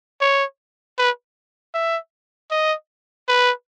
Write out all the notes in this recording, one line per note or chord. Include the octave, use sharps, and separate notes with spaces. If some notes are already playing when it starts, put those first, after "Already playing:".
C#5
B4
E5
D#5
B4